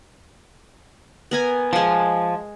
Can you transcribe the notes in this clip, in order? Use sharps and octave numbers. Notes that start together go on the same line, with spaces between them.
B3 A#4 G#5
F3 G#3 C6